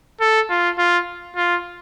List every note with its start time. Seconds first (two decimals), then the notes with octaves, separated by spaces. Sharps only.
0.20 A4
0.50 F4
0.78 F4
1.36 F4